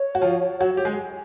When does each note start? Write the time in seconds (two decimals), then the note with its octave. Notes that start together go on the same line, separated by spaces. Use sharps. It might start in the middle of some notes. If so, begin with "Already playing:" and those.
Already playing: C#5
0.15 F#4
0.21 F3 F4
0.60 F#3 F#4
0.77 G4
0.85 G#3 G#4